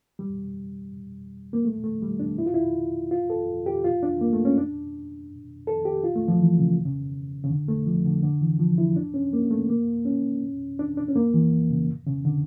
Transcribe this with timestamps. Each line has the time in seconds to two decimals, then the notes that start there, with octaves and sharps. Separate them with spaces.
0.19 G3
1.53 A#3
1.65 A3
1.83 A3
2.02 G3
2.19 D4
2.38 E4
2.46 F4
2.54 E4
3.11 F4
3.30 A4
3.66 G4
3.84 F4
4.03 D4
4.21 A#3
4.33 A3
4.45 C#4
4.58 D4
5.67 A4
5.85 G4
6.04 F4
6.16 A3
6.28 F3
6.40 E3
6.58 C#3
6.85 C#3
7.44 C#3
7.50 D3
7.68 A3
7.87 F3
8.05 D3
8.23 D3
8.41 E3
8.60 F3
8.78 E4
8.96 D4
9.14 C#4
9.33 A#3
9.51 A3
9.69 A#3
10.05 C#4
10.79 D4
10.97 D4
11.08 C#4
11.16 A#3
11.34 E3
11.70 C#3
12.07 C#3
12.25 D3